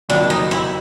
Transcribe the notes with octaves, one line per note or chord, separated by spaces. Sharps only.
F#1 F2 C3 D#3 F#3 D4
D#4
E4